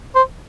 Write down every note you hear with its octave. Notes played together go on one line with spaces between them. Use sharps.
C5